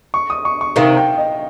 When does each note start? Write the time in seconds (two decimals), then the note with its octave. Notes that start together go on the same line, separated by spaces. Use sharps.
0.14 C#6
0.30 D#6
0.45 C#6
0.61 C#6
0.76 C3 D#3 F5
0.97 G5
1.18 D#5